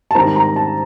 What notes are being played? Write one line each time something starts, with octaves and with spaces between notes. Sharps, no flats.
A5
G#2 D#3 G3 C4 A#5
A#5
A5